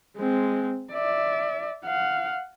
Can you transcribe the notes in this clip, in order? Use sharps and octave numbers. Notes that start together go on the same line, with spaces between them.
G#3 C4
D5 E5
F5 F#5